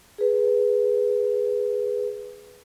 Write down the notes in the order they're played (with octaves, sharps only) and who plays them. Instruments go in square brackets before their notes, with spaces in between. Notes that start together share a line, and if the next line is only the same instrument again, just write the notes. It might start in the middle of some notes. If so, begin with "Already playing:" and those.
[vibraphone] G#4 B4